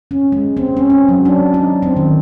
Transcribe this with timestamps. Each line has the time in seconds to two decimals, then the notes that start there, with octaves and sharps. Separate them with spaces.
0.11 C#4
0.32 G#3
0.57 C4
0.77 C#4
0.90 C#4
1.09 F#3
1.25 D4
1.54 D#4
1.82 C4
1.97 D#3